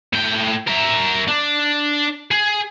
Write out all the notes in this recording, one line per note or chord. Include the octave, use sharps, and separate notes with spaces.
A2 G5
A#4 E5
D4
G#4